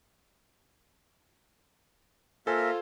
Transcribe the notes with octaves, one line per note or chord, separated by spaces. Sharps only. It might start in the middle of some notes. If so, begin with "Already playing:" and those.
A#3 F4 A4 A#4 C5 E5 G#5